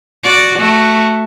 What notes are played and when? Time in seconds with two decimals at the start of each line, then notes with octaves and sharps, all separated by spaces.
0.24 F#4 D5
0.59 A3 F#4